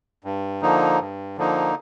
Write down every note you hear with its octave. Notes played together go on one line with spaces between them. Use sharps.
G2
D3 F3 A#3 D#4
G2
D3 F3 A#3 D#4